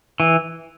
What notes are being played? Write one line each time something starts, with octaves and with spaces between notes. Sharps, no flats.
E3